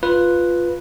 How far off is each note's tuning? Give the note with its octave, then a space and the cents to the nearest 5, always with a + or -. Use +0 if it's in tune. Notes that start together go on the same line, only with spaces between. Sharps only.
F4 +0 B4 +0